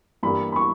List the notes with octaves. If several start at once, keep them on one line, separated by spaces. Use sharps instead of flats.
G2 E3 G3 A#3 B5
B5
C#6